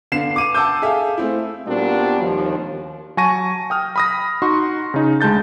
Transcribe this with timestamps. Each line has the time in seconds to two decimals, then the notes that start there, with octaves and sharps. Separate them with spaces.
0.12 D3 B3 F5 C7 E7
0.36 D6 D#7 E7
0.55 F#5 A5 D6 E6 G6
0.82 G#4 A4 E5 F5
1.18 A3 C4 E4
1.67 A#2 G3 B3 C4 D4 F#4
2.21 D#2 F3
3.17 F#3 G#5 A5 C#6 A#6 D#7
3.70 G5 D#6 F6
3.96 B5 D#6 A#6
4.42 D#4 F#4 C6 C#6
4.94 C#3 D#4
5.21 D2 G#3 A5 G6 A6